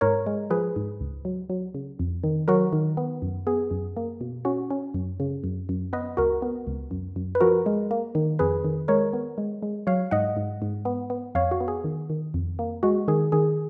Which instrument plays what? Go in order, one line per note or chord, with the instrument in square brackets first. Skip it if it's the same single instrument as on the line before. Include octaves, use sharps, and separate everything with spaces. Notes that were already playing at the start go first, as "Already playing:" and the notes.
[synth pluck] G#2 A#4 C#5
G#3
F3 G#4 B4
G#2
C#2
F#3
F#3
C#3
F2
D#3
F#3 F#4 A#4
D#3
B3
F#2
B3 G#4
F#2
A#3
B2
C#4 F#4
C#4
F#2
C#3
F#2
F#2
B3 B4 D#5
C#2 F#4 A#4
B3
C#2
F#2
F#2
B4
F3 F#4 A#4
G#3
A#3
D#3
F2 G#4 B4
D#3
G#3 A#4 C#5
B3
G#3
G#3
F#3 C#5 F5
G#2 D#5 F#5
G#2
G#2
B3
B3
F2 C#5 F5
F#4
B3
G#4
D#3
D#3
F2
A#3
G#3 F#4
D#3 G#4
D#3 G#4